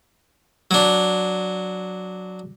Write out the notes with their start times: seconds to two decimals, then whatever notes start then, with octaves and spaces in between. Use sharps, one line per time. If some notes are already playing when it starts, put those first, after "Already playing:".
0.71 F#3 D4